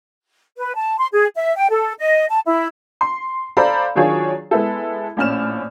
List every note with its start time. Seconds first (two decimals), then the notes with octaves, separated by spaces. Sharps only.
0.57 B4
0.76 A5
0.99 C6
1.12 G#4
1.35 E5
1.56 G5
1.70 A4
1.99 D#5
2.29 A5
2.45 E4
3.01 C6
3.57 A4 C5 D5 F5 A#5 B5
3.95 D#3 F#3 D4 F4 G#4 C#5
4.51 G#3 B3 E4 A4
5.17 A#1 A2 C#4 D5 F6 E7